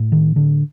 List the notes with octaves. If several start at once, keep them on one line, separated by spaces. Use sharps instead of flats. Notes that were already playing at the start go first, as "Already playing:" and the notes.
Already playing: A2
D#3
D3